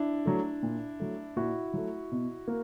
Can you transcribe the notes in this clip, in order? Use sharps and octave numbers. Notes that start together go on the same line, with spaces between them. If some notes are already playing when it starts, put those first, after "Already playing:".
Already playing: D4 E4
F#3 A3
A#2
F#3 A3
A#2 E4 F#4
F#3 A3
B2
A#3